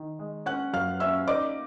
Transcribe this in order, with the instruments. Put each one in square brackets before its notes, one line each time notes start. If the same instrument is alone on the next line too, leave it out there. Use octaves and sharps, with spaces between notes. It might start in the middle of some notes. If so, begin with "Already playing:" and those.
Already playing: [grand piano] D#3
G#3
[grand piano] C#4 [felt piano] F#5 F#6
[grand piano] F#2 [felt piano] F5 F6
[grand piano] C#4 [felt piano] E5 E6
[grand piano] D#4 [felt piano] D5 D6